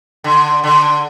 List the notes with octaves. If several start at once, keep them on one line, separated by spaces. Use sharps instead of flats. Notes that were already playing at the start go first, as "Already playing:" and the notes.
D3
D3